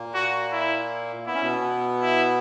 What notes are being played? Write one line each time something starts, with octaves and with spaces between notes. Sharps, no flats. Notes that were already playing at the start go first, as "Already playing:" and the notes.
Already playing: A#2 A#3
F#4
E4
B3 E4
C#4
B2 B3
E4